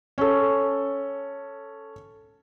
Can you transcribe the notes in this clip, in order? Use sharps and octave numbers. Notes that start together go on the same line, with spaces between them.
C#4 A4